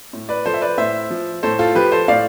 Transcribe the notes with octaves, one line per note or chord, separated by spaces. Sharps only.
A2
B4 D5
F3 A4 C5
E5
B4 D5
A2 C5 E5
F3
A2 A4 C5
F4 A4
F3 G4 B4
A4 C5
A2 D5 F5